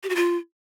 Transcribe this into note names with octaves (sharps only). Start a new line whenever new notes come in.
G4
F#4
F4